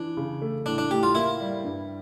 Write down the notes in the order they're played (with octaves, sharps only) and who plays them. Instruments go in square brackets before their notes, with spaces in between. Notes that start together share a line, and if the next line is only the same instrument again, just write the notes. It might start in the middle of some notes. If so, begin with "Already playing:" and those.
Already playing: [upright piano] E3 [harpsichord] D4
[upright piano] C#3
A3
[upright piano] A2 [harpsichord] D4
[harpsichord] D4
[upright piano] A2 [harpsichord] G4
[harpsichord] F4
[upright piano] A#3 [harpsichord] E4
[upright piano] G3
G2